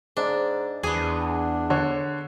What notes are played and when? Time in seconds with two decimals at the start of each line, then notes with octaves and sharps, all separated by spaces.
0.17 G#2 D4
0.83 E2 B3 D4 G#4
1.70 D3 C#5